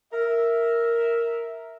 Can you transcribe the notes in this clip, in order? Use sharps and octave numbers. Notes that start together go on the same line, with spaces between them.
A#4 E5